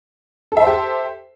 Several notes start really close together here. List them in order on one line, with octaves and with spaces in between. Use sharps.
A4 E5 C5 G4